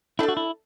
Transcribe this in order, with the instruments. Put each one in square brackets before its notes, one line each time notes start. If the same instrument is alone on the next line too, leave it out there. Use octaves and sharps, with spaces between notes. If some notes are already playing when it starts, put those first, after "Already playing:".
[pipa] A3 D4 A4 [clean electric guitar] E4
[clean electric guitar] F#4
E4